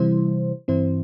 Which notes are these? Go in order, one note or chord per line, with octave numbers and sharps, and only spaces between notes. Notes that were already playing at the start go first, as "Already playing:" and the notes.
Already playing: C3 E3 G3 E4 C5
G2 E3 C4 E4 C5